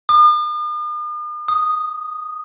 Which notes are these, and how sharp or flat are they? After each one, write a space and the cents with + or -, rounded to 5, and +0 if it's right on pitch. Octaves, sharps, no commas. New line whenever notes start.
D#6 -45
D#6 -5